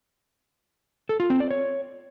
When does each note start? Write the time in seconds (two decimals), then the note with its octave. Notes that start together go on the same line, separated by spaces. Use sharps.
1.09 A4
1.20 F4
1.30 C4
1.40 D5
1.51 C#5